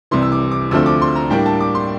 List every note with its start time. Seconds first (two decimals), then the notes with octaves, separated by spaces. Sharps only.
0.11 C2 C3 E3 C6
0.22 E6
0.32 D6
0.51 D6
0.71 D2 D3 F3 A3 C4 E6
0.86 D6
1.02 C6
1.16 A#5
1.30 A2 G3 A#3 D4 G5
1.46 A5
1.61 D6
1.75 C6